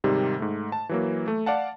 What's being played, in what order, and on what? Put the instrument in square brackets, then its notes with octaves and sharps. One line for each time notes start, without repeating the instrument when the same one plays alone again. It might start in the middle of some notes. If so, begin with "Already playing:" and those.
[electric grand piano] G#2 C3 D#3 G3
G#2 A3
A5
E3 F#3 A#3
A3
D5 F5 F#5 A5